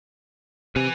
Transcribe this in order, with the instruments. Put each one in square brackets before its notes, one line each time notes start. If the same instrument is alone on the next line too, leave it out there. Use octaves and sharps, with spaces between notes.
[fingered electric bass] C3 [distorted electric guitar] B4 G#5